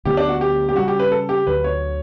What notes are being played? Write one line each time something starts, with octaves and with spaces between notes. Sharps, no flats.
D2 D3 F#3 B3 G4
D4
F#4
G4
G4
C#3 G3 C#4 F#4
G4
B4
A4
G4
D2 D3 F#3 B4
C#5